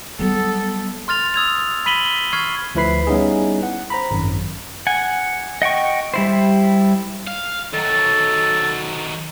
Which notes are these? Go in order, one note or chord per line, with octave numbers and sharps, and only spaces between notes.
F#3 G3 B3 A4
C6 F6 A6 F7
D#6 E6 G#6 F7
B5 B6 D#7 F#7 G7
C#6 F6 G#6 C7
D2 F3 E4 B4 B5 C7
G3 B3 C#4 D#4 E4 G#4
F#5
C5 A#5 B5
G#1 F#2
F#5 G#5
D#5 F#5 G5 C#6
G3 E4 C5
F5
D#3 F#3 A4